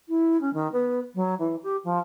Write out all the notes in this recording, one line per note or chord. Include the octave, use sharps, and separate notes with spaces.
E4
C#4
D#3
B3
F#3
E3
G4
F3